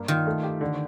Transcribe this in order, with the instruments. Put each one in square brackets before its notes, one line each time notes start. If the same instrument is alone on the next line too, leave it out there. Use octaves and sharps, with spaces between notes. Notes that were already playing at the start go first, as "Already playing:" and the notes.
Already playing: [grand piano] G2 A#3
[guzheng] D#3 [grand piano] F4
[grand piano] A3
G4
D3